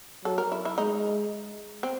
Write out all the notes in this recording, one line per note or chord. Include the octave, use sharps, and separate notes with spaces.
F#3 A4
A#4
E4
E4
G#3 D#4
C4